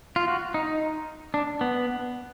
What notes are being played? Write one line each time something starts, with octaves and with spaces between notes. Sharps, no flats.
F4
F#4
D#4
D4
B3